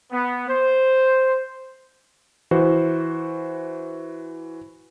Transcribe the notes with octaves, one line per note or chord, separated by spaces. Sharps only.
B3
C5
E3 F#4 C5